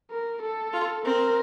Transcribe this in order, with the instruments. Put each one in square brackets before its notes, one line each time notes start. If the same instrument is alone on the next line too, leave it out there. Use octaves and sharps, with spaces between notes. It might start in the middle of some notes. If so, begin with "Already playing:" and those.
[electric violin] A#4
A4
[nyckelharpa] F4
[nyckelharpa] C4 [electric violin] A#4